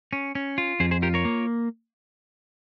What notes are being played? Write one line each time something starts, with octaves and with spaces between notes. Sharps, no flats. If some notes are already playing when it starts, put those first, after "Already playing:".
C#4
C#4
F4
F2 G#4 C5
G#4 C5
F4 G4 A#4
A#4 C#5
A#3